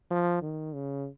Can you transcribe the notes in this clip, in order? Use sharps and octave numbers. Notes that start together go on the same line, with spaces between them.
F3
D#3
C#3